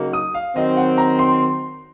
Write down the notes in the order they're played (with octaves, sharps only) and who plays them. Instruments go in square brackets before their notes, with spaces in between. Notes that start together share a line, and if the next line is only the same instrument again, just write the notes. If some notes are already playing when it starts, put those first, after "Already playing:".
Already playing: [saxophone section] C#3 F#3 A#3 D#4 F#4
[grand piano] D#6
F5
[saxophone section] D#3 F#3 C4 [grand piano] D#5
[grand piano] F#5
A#5
C6